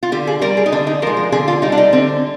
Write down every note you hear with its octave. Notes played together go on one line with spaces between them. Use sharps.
F4
D3 G4
G#4
G3 A#4
G#4
D#4
D3 D4
D#4
F3 G#3 A#4
A#4
D3 G#4
F4
G3 D#4
D4
D#4
D3 C4